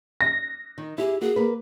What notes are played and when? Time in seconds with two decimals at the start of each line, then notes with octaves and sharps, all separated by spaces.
0.21 A#6
0.78 D#3
0.98 E4 G4 G#4
1.21 A#3 F#4 G#4
1.36 A#3 B4